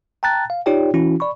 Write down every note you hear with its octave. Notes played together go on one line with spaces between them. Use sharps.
G5 A5 A#5 F#6 A6
F5
D#4 F4 G4 C#5 D5 G5
E3 C#4 E4 F#4
D5 B5 C#6